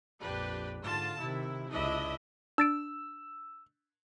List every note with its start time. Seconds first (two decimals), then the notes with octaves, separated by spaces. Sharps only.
0.22 A#1 F2 D4 G4 B4
0.84 G#2 D3 F4 A5
1.20 C3 D#3 E4
1.71 C#2 D4 E4 D#5 E5
2.58 D4 E6 A6 D7